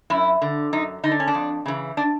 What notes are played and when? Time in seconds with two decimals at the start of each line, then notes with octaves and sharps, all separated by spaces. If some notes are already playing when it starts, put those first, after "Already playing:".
0.10 F#2 E4
0.42 D3
0.73 F#2 D#4
1.03 D3 D#4
1.11 D4
1.20 C#4
1.28 D4
1.34 F2
1.66 C#3 E3
1.97 D4